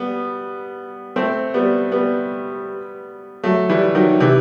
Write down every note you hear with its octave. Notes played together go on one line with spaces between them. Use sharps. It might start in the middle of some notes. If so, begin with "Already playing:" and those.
Already playing: G3 B3
A3 C4
G3 B3
G3 B3
F#3 A3
E3 G3
D#3 F#3
C3 E3